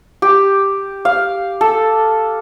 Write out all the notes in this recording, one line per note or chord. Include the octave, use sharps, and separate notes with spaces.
G4
F5
A4